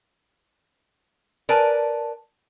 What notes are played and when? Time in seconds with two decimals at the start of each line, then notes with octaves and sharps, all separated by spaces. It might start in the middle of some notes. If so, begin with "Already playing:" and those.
1.49 A#4 B4 D5 G#5 A5